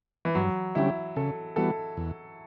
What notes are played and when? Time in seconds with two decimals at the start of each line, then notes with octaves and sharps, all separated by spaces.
0.25 E3
0.35 G2 F#3
0.75 D3 G3 C#4 E4 G4
1.16 C#3 A4
1.56 E3 G3 B3 F#4 A4
1.97 E2